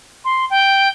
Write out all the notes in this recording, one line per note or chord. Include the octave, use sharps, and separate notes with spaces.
C6
G5